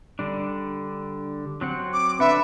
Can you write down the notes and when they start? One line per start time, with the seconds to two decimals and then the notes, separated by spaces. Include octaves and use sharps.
0.19 D3 G3 D4
1.61 F#3 C4 F#5
1.93 D6
2.20 D3 D4 B4 E5 F#5